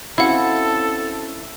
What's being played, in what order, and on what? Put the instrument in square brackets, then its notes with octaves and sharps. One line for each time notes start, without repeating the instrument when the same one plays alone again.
[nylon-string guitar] C4 C#4 F#4 [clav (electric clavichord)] E4 [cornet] A4 [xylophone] F5 F#5